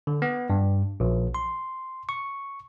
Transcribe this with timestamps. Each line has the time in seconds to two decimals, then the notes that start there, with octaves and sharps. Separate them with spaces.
0.07 D3
0.22 B3
0.50 G2
1.00 A#1
1.35 C6
2.09 C#6